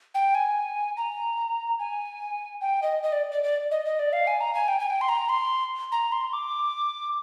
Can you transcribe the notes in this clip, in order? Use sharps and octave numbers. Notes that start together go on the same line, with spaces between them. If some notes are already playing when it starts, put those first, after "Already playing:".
G5
G#5
A#5
G#5
G5
D#5
D#5
D5
D5
D5
D#5
D#5
D5
F5
G#5
A#5
G#5
G5
G#5
G5
C6
A#5
C6
A#5
C6
D6